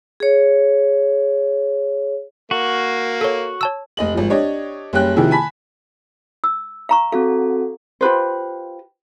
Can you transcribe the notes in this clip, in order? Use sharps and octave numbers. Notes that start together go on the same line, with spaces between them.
G#4 C#5
A#3 F#4
A4 C#5
C#5 A5 E6
F1 D#5 F#7
G#1 F3
D4 G4 C#5 D#5
F#1 G3 C#4 G5 F#6
C3 D#3 F3 E4 G#4
G#5 A5 B5 B6
E6
F5 A#5 C#6
C4 F#4 A4 F5
F4 G4 B4 C5